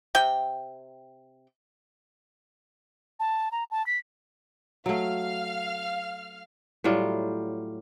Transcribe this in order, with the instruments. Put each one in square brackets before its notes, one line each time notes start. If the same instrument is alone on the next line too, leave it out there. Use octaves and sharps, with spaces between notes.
[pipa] C3 G5
[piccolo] A5
A#5
A5
B6
[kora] F#3 A3 [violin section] F5 F6
[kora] A2 F#3 G3 F4